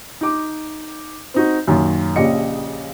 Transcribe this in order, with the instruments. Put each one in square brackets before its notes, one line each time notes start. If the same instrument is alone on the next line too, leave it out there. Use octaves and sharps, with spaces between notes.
[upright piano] D#4 D6
C4 D#4 F#4
F#2 A#2 D#3
A#1 C#3 G4 D#5 C#7